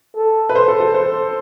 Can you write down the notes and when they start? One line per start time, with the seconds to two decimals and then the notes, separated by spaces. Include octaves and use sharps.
0.16 A4
0.49 B4
0.55 C5
0.68 A4
0.80 A4
0.94 C5